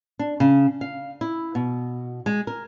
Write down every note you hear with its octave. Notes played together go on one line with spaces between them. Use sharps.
D4
C#3
F5
E4
B2
G#3
A#4